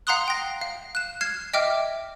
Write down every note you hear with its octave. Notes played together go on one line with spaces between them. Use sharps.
F5 F#5 A#5 C6 D#6 F#6
G5 A#6
F5
F#6 E7
F6 G#6 C7 E7
D#5 E5 G5 D6 F6